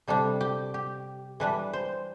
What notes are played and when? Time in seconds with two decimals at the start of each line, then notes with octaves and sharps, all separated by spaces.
0.07 C3 G3 D4 A4
0.41 G4
0.74 G4
1.40 E3 G3 D4 B4
1.73 C5